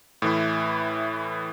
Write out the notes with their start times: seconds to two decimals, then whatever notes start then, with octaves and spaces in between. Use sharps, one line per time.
0.22 A2 E3 E4